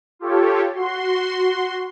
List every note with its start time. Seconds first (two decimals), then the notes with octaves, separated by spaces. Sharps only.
0.19 F4 G4 A4 C#5
0.75 F#4 C6